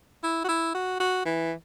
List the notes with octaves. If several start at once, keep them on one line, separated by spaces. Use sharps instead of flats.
E4
F#4
E4
F#4
F#4
E3